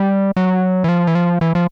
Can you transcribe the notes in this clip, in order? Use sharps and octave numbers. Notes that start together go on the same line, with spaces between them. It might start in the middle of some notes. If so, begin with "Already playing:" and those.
Already playing: G3
F#3
E3
F3
E3
F3
E3
F3